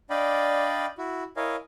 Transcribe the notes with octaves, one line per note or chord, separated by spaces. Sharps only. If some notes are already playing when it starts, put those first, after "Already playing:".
D4 D5 D#5 F5 G5 B5
E4 F#4
E4 A#4 C#5 D#5 F5 G#5